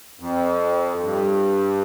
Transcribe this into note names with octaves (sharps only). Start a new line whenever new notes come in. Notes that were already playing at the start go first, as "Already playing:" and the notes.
F2
G2